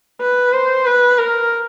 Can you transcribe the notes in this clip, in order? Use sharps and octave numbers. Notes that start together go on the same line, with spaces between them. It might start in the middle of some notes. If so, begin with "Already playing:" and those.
B4
C5
B4
A#4